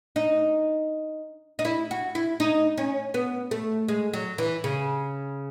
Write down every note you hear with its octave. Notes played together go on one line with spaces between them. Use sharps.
D#4
D#4
E4
F#4
E4
D#4
C#4
B3
A3
G#3
F#3
E3
C#3